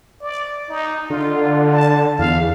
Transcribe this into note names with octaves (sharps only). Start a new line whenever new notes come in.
D5
D#4
D3 F4
A5
E2 F5